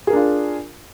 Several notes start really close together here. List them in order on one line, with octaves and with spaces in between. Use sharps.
G#4 A#4 D4 F4